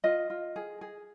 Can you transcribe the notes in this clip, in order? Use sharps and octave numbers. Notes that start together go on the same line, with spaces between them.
F4 D#5
F4
G#4
G#4